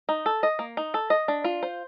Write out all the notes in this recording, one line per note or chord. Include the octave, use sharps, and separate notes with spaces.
D#4
A4
D#5
A#3
D#4
A4
D#5
D4
F4
C5